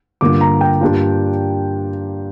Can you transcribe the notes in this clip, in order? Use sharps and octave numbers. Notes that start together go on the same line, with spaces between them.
G2 D3 A#3 F4 D6
A#5
G5
G2 G3 A#3 D4 F4